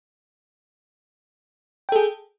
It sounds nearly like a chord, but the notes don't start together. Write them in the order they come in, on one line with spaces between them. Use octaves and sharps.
G5 A4 G#4